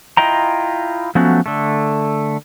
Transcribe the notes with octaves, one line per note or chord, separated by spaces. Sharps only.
E4 F4 D#5 G5 A#5
F3 F#3 A3 B3 C#4 F#4
D3 A3